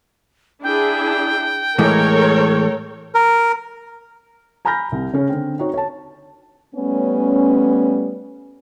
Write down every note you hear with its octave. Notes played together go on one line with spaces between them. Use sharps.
D4 E4 G#4 G5
A2 E3 G#3 A4 A#4 C#5
A#4
G#5 A#5 B5 F6 G6 A#6
C2
C#3 C#4
D3 C4
C4 D#4 F#4 C#5
C#5 A5
G3 A3 B3 C#4